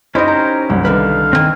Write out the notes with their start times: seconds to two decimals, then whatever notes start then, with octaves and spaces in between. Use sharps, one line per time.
0.15 C#4 D#4 E4 G4 A#4 C5 D#5
0.28 A#5
0.70 C2 F#3
0.85 D3 D#3 B4 F5
1.33 C2 D#3 C4 G#5 E6